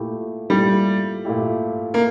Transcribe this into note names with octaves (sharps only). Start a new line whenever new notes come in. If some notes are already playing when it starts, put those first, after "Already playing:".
Already playing: A#2 A3 E4 G4
A#2 G3 A3 E4 G4
A#2 A3 E4 G4
A#3